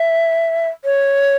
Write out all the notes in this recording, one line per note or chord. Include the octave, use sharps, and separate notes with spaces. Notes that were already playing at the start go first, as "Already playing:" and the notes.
Already playing: E5
C#5